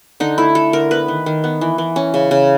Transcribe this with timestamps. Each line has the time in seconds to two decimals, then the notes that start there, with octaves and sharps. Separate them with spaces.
0.20 D3 D#4
0.38 A3 E4
0.55 A3 A4
0.73 D3 A#4
0.91 B3 B4
1.08 D#3
1.26 D#3
1.44 B3
1.61 E3
1.78 E3
1.96 C#4
2.14 C#3
2.31 C#3